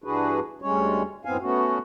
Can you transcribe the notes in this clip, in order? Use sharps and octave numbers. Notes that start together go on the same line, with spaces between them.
G2 E3 D4 F#4 G#4 B4
D2 G3 G#3 C#4 C#5
F#2 A2 B3 C4 F5 G#5
A3 B3 C#4 F#4